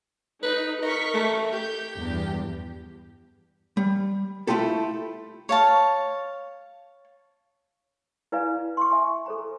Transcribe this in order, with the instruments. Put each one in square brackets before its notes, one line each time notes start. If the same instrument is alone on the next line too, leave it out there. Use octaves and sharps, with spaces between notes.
[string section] D#4 [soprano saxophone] B4
[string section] A#4 C#6 B6 [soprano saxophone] D#5
[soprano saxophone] A3
[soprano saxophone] G4 [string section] G6
[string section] E2 G2
[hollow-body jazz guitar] G3
A3 E4 F4 G4 A4
[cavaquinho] C#5 F5 A5
[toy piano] E4 B4 D5 F5 G#5 A#5
C6 C#6
E5 G#5 C6
A4 C5 A#5